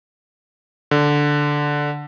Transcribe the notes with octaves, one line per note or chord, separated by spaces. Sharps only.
D3